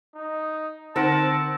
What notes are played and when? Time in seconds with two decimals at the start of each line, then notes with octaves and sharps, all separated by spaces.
0.15 D#4
0.96 D3 C4 D#4 A#4 C5 F#5 A5